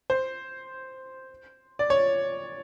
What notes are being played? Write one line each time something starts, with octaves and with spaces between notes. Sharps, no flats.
C5
D5
C#5